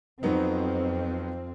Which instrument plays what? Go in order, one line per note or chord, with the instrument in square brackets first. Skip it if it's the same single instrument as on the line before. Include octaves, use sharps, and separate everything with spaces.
[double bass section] F2 C4 [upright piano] F#3 B3 D#4